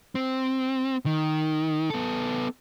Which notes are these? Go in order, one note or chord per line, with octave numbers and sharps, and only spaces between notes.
C4
D#3
B3 A4